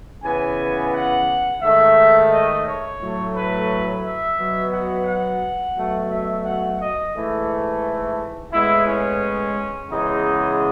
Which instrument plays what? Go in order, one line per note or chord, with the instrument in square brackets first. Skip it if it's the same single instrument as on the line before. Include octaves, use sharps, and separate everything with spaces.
[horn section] C#3 E3 B3 G#5
F#5
G#2 D#3 A3 E5
D#5
C#5
A2 F#3 A3
B4
E5
B2 F#3 B3
F#5
F#5
B2 F#3 A3
E5
F#5
D#5
G#2 E3 A3
A2 G#3 B3 E4
C#4
C#3 E3 G#3 B3 D#4